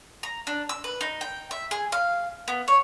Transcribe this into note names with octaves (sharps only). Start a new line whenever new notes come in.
A#5
D4
E6
B4
D#4
G5
E5
G#4
F5
B3
C#5